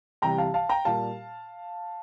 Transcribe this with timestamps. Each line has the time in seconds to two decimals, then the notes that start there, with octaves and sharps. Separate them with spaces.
0.22 C3 E3 G3 G5 A#5
0.38 F5 A5
0.54 F5 A5
0.69 G5 A#5
0.85 A#2 G3 F5 A5